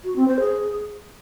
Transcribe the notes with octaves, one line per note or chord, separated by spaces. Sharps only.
F#4
C4
C5
G#4